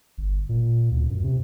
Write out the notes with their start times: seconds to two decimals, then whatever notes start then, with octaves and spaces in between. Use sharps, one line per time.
0.18 G1
0.49 A#2
0.91 D2
1.10 F#2
1.24 C3